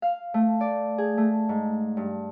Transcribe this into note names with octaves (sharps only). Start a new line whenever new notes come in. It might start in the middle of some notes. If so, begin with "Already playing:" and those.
F5
A3
D5
G#4
A3
G#2
G2